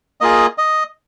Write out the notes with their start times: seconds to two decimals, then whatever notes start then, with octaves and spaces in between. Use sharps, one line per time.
0.21 A#3 F4 G#4 D#5
0.58 D#5